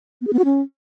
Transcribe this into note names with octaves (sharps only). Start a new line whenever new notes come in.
B3
G#4
B3
F#4
C#4